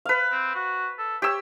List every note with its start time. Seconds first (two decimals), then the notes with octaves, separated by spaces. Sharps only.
0.05 B4 F5
0.32 C4
0.55 F#4
0.98 A4
1.22 G4 C#5 E6